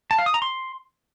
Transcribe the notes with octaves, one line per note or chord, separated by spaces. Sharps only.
A5
F5
D#6
A#5
C6